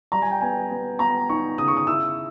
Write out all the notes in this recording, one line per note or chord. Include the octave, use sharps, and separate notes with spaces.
G3 A#5
G#5
G5
B3 G#5
B3
B3 A#5
D#4 C#6
C#3 D#6
C#6
D#6
E4 E6